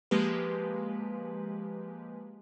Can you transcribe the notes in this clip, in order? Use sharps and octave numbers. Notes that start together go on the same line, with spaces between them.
F3 G#3 A#3 G4 B4